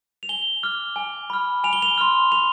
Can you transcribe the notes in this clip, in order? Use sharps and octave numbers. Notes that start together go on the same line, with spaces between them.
F7
G#5 G7
D6 F6
G#5
B5 F6
G#5 F7
G7
F7
C6 F6
C6 F7